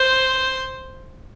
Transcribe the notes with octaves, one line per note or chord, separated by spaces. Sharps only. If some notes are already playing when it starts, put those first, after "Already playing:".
Already playing: C5